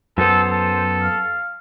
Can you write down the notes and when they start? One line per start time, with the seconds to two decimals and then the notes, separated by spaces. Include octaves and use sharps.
0.18 F#2 B3 A4 C5
0.51 A4
1.02 F5